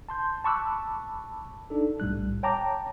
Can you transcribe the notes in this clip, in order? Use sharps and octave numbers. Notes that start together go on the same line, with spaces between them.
A5 C6 G6
A5 B5 C#6 D6 E6 F#6
D4 D#4 A4
B1 A2 G3 F#6
C#5 G5 A5 A#5 D6